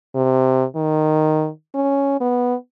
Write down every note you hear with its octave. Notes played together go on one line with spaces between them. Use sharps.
C3
D#3
C#4
B3